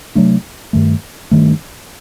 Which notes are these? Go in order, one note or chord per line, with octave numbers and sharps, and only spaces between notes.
C3 F#3 A3 D4
G2 D#3 A3
G2 D#3 A3